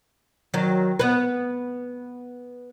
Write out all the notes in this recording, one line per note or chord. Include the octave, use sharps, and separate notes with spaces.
D#3 F#3
B3 B4